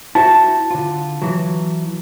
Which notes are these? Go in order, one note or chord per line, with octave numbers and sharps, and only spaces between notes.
E4 F#4 C5 A5
D3 F4
E3 F#3